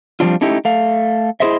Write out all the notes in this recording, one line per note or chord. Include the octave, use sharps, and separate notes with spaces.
F3 G3 C4 D4 F4
A3 C#4 D#4 E4 G4
A3 F5
E4 F#4 G#4 C5 D#5 E5